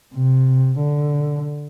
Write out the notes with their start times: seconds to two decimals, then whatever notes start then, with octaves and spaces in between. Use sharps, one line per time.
0.14 C3
0.80 D3